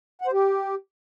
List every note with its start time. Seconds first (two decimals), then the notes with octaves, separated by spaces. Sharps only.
0.22 F#5
0.27 C5
0.32 G4